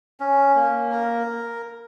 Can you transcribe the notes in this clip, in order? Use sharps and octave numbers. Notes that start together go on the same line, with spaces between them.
C#4
A#3
A#4